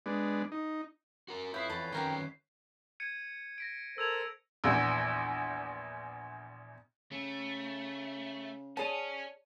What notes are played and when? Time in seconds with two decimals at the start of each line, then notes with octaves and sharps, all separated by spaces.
0.06 G#3 B3 D4
0.52 D#4
1.28 F#4 A#4
1.54 F2 E4 B4 C#5 D#6 G6 B6 C7
1.70 E2 A4 B5
1.92 D#3 C#4 F#4 G4 A#4 G5
3.00 G#6 C#7 D#7
3.58 A#6 B6 D7
3.98 A4 A#4 C5 E6 G#6 F7
4.64 A#1 E2
7.12 C#3 A3
8.77 C#4 G#4 C#5 D5 A5 D#7